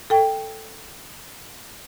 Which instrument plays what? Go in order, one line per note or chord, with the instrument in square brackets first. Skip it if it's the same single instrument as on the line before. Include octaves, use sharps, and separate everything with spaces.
[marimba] A4 G5